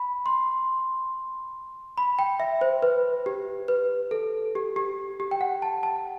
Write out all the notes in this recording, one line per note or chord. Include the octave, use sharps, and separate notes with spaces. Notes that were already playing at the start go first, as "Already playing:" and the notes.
Already playing: B5
C6
B5
G5
E5
C5
B4
G4
B4
A4
G4
G4
G4
G5
F#5
A5
A5